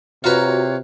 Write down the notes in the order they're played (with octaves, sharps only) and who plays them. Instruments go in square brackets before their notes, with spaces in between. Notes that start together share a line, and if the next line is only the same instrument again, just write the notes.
[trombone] C3 [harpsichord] F4 B4 [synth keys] F#4 A#5 [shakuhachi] C#5